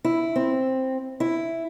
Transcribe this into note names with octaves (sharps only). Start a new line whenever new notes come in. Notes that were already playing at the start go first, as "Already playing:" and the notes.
E4
C4
E4